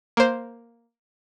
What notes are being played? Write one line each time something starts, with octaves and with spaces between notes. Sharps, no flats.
A#3 C5